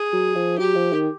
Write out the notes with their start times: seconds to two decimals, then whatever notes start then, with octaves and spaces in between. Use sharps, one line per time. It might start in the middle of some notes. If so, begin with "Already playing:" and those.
Already playing: G#4
0.13 F#3
0.35 F3
0.58 F#3 G4
0.75 F3
0.93 D#3